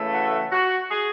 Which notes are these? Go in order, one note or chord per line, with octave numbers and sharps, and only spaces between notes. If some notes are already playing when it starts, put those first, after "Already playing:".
Already playing: C#3 E3 A3
F#4
F#4
G#4